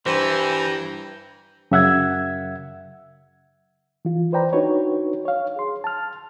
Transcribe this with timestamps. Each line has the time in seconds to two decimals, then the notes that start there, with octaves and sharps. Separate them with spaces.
0.06 G2 E3 C5 G5 A#5
1.71 F#2 C#3 E5 F#5 E6 G#6
4.05 E3 F4
4.32 B4 C5 D5 G5 A#5 B5
4.53 D4 D#4 F#4 B4 C#5
5.25 C#5 F5
5.56 G#4 C6
5.84 A5 F6